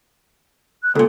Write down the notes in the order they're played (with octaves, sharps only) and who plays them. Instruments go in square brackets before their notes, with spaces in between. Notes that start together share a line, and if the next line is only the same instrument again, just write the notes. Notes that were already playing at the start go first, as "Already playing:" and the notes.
[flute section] F#6
[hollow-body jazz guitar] C#2 A#2 [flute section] A4